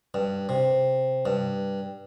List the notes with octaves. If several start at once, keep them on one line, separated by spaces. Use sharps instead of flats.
G2
C3
G2